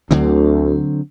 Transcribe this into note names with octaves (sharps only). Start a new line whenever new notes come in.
D2 D3 F#3 C4